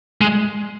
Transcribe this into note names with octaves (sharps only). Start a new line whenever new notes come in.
G#3